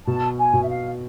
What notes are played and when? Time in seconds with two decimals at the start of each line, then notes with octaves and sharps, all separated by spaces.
0.07 B2 A5
0.38 G#5
0.53 B2
0.63 E5
0.69 F5